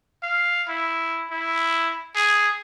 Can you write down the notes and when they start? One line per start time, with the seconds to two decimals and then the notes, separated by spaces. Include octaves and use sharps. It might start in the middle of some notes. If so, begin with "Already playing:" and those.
0.23 F5
0.68 E4
1.31 E4
2.16 G#4